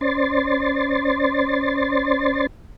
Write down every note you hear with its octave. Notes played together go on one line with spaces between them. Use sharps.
C#4 C5 D5 C6 A6